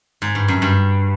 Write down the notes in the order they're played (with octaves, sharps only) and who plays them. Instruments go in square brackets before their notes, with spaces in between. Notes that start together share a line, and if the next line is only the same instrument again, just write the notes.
[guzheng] G#2
G2
F#2
G2